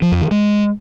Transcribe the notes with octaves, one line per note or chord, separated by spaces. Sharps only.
F3
F2
D#3
G#3